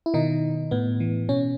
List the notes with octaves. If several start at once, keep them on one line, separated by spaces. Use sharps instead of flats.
E4
B2 D#3 D#4
A2 B3
E3
B2 C#4